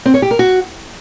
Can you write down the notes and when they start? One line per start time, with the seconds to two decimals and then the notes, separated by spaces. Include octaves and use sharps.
0.06 C4
0.14 C#5
0.22 G4
0.31 A#4
0.39 F#4